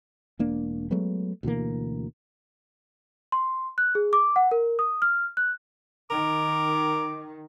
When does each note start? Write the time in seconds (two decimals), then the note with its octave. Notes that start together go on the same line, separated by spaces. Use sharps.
0.39 E1 A#3 D4
0.91 F#3 G#3 A3 B3
1.43 D2 B2 E3 A#3
3.32 C6
3.78 F#6
3.95 G#4
4.13 D6
4.36 F#5
4.51 A#4
4.79 D#6
5.02 F6
5.37 F#6
6.11 D#3 A#4 D6